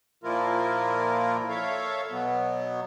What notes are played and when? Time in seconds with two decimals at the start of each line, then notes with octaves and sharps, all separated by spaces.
0.24 A#2 F3 A#3 E4 F4 A#4
1.49 A4 C#5 E5 F5
2.11 B2 F#3 B3